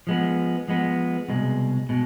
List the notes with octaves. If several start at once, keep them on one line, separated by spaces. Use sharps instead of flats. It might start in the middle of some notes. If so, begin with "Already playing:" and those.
F3 G#3 B3
F3 G#3 B3
C2 B2 G#3
B2 G#3